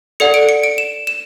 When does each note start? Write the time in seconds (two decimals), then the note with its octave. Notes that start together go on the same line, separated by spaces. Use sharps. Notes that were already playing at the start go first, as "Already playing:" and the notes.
0.20 A4 D5 F#5 C#7
0.34 D7
0.49 C#7
0.63 D7
0.78 E7
1.07 E7